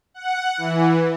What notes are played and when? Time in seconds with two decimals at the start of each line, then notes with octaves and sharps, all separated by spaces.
0.14 F#5
0.58 E3